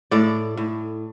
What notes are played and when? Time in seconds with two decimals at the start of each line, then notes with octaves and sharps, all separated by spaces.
0.11 A2 D5
0.57 A2